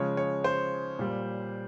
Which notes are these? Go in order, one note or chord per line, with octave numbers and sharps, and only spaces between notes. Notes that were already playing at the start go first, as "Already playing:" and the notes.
Already playing: C#3 F3 G#3 C#5
C#5
C5
A#2 G3